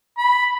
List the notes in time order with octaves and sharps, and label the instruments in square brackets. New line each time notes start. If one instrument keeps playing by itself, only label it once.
[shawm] B5